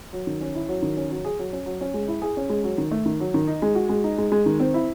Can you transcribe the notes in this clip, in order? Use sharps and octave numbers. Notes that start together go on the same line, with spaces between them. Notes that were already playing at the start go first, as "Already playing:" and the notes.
F#3
D#3
C#4
E4
F#3
D#3
C#4
F#3
G#4
F#3
C#4
F#3
C#4
G#3
E4
G#4
C#4
G#3
F#3
D#3
A3
D#3
F#3
D#3
D#4
G#3
F#4
G#3
D#4
G#3
G#3
D#3
C4
E4